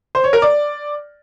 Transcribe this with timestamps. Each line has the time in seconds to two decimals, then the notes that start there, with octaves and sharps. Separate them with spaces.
0.15 C5
0.24 C#5
0.33 A#4
0.42 D5